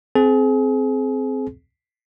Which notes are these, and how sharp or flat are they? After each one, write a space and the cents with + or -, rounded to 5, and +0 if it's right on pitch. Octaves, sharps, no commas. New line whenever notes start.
C4 -5 G#4 +35